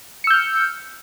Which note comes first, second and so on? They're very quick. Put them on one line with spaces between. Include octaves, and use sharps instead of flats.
C#7 E6 G6 F6